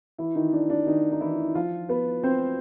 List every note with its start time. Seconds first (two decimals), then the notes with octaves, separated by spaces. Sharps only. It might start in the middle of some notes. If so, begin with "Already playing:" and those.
0.18 E3 E4
0.35 D#3 D#4
0.52 D4
0.70 D4
0.86 D#3 D#4
1.12 D#4
1.21 E3 E4
1.55 F3 F4
1.89 B3 B4
2.23 C4 C5